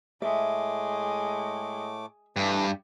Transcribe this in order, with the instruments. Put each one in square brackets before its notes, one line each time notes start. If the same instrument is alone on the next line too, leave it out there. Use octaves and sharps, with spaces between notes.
[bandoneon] A2 A3 D6 [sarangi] G#3 [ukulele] E5
[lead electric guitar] G2 [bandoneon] E3 A3 B4